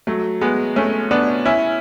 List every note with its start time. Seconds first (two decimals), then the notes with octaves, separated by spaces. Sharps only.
0.07 F#3 A3
0.41 G#3 B3
0.76 A3 C#4
1.11 B3 D4
1.45 C#4 E4